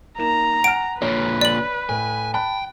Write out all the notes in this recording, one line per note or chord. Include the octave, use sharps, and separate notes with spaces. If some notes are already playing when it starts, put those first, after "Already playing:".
A#3 D#4 A#5 E7
F#5 G#5 F6 D7
A#2 D3 B4 C#5 A#5
D5 F#7
A2 G#5
G5 A5 B5 F#6